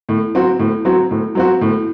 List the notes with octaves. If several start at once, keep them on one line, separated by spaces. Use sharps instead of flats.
A2
F#3 C4 F#4
A2
F#3 C4 F#4
A2
F#3 C4 F#4
A2